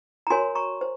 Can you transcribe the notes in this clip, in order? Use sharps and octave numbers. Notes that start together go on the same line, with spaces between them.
A#5
F#4 A#4 C#5 G#5 C6
A#5 C#6
C5